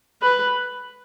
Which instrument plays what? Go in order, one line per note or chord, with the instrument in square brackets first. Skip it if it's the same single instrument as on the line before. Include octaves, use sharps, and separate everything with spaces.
[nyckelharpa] B4